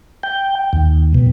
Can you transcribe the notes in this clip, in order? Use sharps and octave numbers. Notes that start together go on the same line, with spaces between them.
G5
D#2
B2